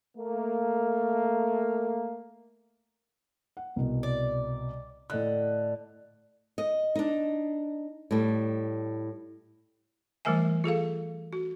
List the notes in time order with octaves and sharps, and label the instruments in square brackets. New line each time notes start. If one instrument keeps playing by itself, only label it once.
[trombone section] A3 A#3
[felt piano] F#5
C2 B2
[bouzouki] D5
[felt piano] A2 D#5 F#6 [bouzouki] D3
[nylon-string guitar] D#5
D4 D#4
A2 G3
[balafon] E3 G3 A3 A#4 E5 G#5
F4 G#4 A4 F5
F#4